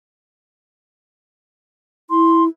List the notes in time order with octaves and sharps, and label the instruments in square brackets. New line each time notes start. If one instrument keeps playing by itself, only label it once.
[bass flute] E4 [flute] C6